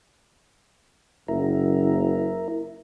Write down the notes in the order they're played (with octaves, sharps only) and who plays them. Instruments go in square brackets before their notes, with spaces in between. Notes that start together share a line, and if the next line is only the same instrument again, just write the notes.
[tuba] F#1 [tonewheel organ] E4 A#4